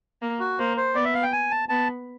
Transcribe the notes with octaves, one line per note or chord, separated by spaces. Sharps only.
A#3
F#4
A#3 C5
C5
B3 D5
E5
F5
G5
G#5
A5
B3 A5